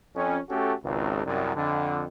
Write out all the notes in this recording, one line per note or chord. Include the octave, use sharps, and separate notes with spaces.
F2 C#4
A3 C#4 F#4 G4 A4
G#1 C#2
C2 F#2
F2 D3